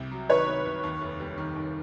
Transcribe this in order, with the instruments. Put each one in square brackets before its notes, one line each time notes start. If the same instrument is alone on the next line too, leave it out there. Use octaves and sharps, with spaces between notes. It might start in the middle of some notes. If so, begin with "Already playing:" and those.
Already playing: [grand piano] C2 C3
F#3
[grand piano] D#3 [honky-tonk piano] B4 C#5
[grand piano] C3
C2
D#2
F1
G3
D#3
D#2